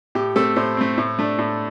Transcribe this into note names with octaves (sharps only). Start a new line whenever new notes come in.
A2 G4
A3 C4 A4
A2 C5
A3 C4
A2
A3 D4
A2